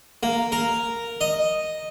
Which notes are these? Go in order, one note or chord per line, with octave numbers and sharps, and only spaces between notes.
A#3
A#4
D#5